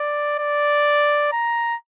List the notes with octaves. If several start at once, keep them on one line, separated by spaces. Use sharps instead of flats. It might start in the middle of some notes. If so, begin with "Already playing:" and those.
Already playing: D5
D5
A#5